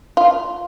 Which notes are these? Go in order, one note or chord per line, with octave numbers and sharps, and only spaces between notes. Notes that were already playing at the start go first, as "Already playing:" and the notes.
F4